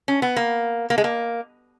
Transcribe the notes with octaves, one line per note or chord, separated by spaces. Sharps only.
C#4
B3
A#3
A#3
G#3
A#3